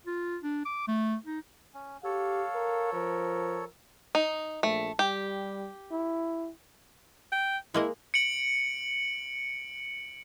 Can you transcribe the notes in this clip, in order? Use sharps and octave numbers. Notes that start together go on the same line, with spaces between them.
F4
D4
D6
A3
D#4
C#4
G4 A4 C#5 F5
A#4
F3 A#4
D#4
A#1 A3
G3 G4
E4
G5
G#3 A#3 E4 D#5
C#7 D7 F#7